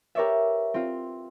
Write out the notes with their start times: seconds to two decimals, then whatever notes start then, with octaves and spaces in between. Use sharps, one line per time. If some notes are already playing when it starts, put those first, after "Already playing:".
0.15 G4 A#4 B4 C#5 D5 E5
0.74 C4 F4